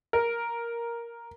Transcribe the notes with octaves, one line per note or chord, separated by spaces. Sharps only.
A#4